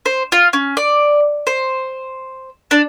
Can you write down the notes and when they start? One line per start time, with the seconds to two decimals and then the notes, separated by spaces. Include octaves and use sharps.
0.06 C5
0.32 F4
0.53 C#4
0.77 D5
1.47 C5
2.71 D4